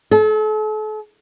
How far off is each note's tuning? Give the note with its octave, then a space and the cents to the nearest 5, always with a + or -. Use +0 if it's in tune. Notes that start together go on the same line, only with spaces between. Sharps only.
A4 -40